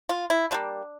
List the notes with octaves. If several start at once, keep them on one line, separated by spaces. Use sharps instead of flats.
F4
E4
D3 G3 A#3 D4